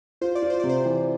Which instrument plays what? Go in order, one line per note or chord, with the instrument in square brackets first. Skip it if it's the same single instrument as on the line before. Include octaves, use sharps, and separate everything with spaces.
[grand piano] F4 [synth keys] C5
[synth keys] D5
[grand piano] F4
[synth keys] C5
[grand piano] C3 [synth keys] D5
[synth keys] C5
[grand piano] E3